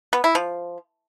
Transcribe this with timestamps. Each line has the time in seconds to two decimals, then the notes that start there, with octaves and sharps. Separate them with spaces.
0.13 B3
0.24 E4
0.35 F3